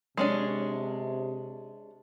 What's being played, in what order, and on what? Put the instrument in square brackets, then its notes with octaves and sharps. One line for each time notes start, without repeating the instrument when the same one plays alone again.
[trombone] C3 [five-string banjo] G#3 C#4 D4